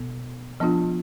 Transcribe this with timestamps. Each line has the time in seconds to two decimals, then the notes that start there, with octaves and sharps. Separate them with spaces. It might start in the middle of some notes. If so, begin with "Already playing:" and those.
Already playing: B2 B3
0.60 F3 B3 D4 F4